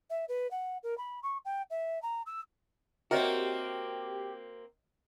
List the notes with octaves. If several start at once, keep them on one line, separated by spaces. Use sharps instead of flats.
E5
B4
F#5
A#4
B5
C#6
G5
E5
A#5
E6
A#3 C4 F#4 G4 A#4 C#5 D#5 E5